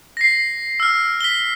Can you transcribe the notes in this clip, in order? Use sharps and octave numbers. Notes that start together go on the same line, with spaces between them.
A#6 C7
E6 F6
B6 G7